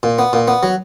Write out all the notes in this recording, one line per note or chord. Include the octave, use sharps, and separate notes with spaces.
A#2
B3
A#2
B3
F#3